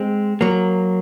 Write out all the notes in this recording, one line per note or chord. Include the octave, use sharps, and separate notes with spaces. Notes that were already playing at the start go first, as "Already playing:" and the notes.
Already playing: G#3 C4
F#3 A#3